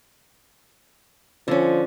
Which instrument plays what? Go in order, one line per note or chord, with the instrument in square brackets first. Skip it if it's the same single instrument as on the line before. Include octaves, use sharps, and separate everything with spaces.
[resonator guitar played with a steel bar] D3 C#4 [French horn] F3